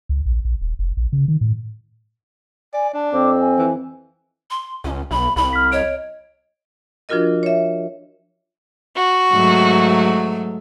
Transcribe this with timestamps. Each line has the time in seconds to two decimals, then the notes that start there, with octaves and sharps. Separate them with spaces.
0.09 C#2
0.26 A#1
0.45 A#1
0.61 D#1
0.79 F1
0.97 A#1
1.13 C#3
1.28 D#3
1.41 A2
2.74 D5 G#5
2.94 D4 A5
3.12 F2 C4 D6
3.40 G#5
3.59 E3
4.50 C6
4.84 C#2 C#4
5.11 B1 B5
5.36 C2 B5
5.53 F6 B6
5.72 C#5 D#5 D7
7.09 F3 D4 F4 F#4 A#4 D#5
7.43 C#5 E5
8.96 F#4
9.33 G#2 F#3 A3